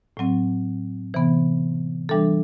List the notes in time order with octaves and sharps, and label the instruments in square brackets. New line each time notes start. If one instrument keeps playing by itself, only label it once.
[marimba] A2 F#3 C4
C3 E3 B3
E3 G3 D4 A4